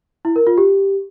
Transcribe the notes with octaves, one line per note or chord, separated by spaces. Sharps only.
E4
A#4
F4
G4